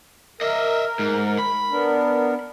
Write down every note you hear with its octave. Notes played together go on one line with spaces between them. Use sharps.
A#4 D#5 E5
G#2
B5
B3 D4 A#4